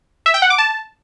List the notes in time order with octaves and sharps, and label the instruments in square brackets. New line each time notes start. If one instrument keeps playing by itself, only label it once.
[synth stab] E5
G5
F#5
D6
A5